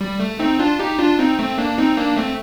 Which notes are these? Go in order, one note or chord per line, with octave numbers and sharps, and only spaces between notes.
G3
A3
C4 D#4
D4 F4
D#4 G4
D4 F4
C4 D#4
A3 C4
A#3 D4
C4 D#4
A#3 D4
A3 C4